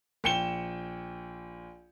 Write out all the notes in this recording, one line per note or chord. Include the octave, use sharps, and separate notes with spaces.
A#1 G5 C#7 E7 G7